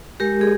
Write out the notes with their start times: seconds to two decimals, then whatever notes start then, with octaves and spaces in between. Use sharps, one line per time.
0.20 G#3 G4 A#4
0.41 G#4